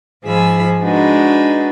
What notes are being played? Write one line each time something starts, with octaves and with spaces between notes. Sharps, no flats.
G#2 F3 G#4 B5 E6
G#3 D4 D#4 F#4 B4